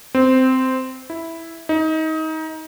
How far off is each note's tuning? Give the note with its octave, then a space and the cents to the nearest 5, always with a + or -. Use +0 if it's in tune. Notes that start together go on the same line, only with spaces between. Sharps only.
C4 -10
E4 -5
D#4 +25